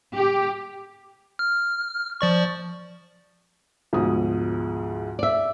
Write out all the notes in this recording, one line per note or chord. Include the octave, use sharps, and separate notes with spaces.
G4
F6
F3 D5 C#6
D2 G#2 B2 F3 D#6
D5 E5